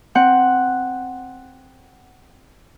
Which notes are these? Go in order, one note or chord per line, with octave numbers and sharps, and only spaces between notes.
C4 F#5